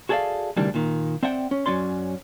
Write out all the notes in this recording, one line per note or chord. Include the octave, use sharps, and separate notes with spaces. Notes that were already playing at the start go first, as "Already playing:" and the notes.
F#4 G#4 A4 D5 E5 F5
D2 C3 D#3 E3 G3 D4
A#2 D#3
C4 D5 E5 F#5 G5
C#4
F#2 F#3 C#4 D5 C6